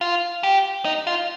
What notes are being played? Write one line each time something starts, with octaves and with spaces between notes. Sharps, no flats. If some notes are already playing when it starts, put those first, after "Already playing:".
F4
G4
D#4
F4